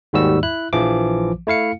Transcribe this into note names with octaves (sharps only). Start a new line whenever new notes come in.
D#2 G#2 D#3 G3 F#4 E6
E4 F#6
A#1 E3 F3 D6
A3 E4 F5 C#7